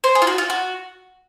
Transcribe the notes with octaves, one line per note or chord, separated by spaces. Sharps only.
C5
G#4
F4
F#4
F4
F#4